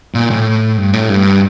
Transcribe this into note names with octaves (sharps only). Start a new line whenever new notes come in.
A#2
A2
G2
A2
G2